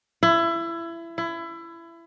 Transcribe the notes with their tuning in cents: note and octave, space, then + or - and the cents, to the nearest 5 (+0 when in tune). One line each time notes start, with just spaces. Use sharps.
E4 +25
E4 +25